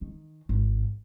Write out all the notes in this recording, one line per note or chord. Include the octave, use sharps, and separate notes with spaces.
D#3
G#1